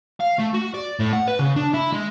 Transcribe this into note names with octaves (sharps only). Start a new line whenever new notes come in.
F5
A3
F#4
D5
A2
F#5
B4
C#3
D4
E4
G#3